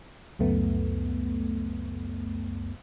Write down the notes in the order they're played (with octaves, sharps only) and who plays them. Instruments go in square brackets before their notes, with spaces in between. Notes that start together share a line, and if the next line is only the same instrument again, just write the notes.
[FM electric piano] C#2 F#2 A3 B3